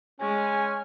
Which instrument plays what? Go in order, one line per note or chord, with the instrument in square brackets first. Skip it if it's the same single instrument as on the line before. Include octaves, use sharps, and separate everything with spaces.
[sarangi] G#3 [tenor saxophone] C#4 [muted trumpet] G#5